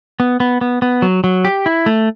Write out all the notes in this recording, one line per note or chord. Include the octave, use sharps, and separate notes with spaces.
B3
B3
B3
B3
F#3
F#3
G4
E4
A3